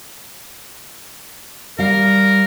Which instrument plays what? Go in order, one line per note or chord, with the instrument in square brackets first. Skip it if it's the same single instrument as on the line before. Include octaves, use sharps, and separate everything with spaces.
[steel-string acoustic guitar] G3 F5 [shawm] A#4